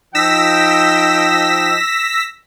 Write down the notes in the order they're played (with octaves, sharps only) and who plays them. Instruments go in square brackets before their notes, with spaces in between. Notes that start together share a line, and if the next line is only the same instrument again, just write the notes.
[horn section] F3 D#4 G5 [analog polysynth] E6 A#6 B6